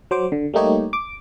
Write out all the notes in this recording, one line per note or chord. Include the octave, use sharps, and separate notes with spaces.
F#3 C5 D6
D3
G3 A3 A#3 D#4 G4 C#5
D6